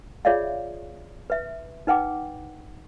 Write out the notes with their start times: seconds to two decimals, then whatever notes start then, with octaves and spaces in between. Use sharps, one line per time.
0.25 F4 G#4 C#5 D5 E5 F5
1.30 B4 E5
1.87 D#4 B4 F#5 G5 D6